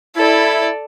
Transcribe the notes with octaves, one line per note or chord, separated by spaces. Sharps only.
E4 A4 D5